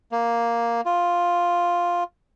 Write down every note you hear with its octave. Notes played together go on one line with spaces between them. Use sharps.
A#3
F4